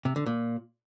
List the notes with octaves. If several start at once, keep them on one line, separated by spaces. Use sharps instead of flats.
C3
D3
A#2